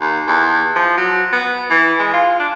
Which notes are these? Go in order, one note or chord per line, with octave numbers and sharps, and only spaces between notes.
D#2
E2
F3
F#3
B3
E3
G#3
F4
D4